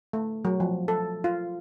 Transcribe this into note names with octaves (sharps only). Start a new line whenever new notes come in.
A3
F#3
F3
A4
F4